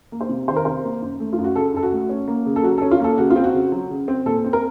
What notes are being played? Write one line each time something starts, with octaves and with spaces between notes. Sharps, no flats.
A#3
C5
C3
D#3 C5
A#4
C3 C5
A#3
F#2
A3
F4
F#2
F#4
C#3 A4
F#2 A4
F#4
A3
C#4
A#3
C#3
A4
F#3 F#4
A4
C#4
F4
A#3 A4
C#3 F#4
F4
C4
F#4
C#3
F#3
C#3
C4
A#2 A4
C4
A#4